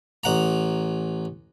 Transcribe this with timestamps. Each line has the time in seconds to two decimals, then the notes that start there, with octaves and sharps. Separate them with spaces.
0.24 A1 F#5 A#5